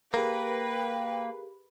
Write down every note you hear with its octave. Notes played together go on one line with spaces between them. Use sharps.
A#3 G4 G#4 A#4 B4 G5